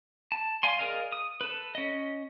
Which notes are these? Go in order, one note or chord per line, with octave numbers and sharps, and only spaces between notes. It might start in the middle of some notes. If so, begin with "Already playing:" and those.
A5
D5 F5 G#5 C6
G#4 A#4 D5 D#5 F5
D#6
A4 B4
C#4 D#5